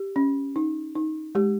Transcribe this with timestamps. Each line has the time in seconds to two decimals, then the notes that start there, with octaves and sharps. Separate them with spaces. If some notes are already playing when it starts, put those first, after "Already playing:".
Already playing: G4
0.16 C#4
0.56 D#4
0.95 D#4
1.35 G#3 G4